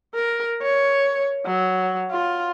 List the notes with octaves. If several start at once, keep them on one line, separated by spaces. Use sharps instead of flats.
A#4
C#5
F#3
F4